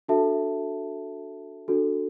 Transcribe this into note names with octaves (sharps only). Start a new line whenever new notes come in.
D4 F#4 A4 E5 A5
D4 F#4 A4